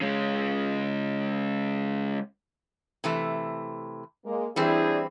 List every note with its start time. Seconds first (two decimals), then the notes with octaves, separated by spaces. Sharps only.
0.01 C#3 G#3
3.04 C3 E3 A3
4.25 G#3 A#3
4.56 E3 G3 C4 D4 E4 G#4